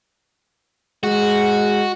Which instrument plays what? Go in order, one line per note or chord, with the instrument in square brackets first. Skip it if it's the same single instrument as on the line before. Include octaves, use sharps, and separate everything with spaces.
[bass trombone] G#3 [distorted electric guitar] F#4